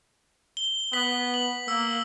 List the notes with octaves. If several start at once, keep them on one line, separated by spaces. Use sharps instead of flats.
G7
B3 B6 F#7 G7
F#7
A#3 E6